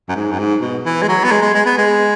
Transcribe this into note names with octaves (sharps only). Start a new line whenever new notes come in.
F#2
G#2
F#2
G#2
B2
E3
G#3
F#3
B3
G#3
G#3
G#3
B3
G#3